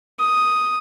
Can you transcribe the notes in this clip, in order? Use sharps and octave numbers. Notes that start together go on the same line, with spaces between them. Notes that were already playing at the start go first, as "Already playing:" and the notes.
D#6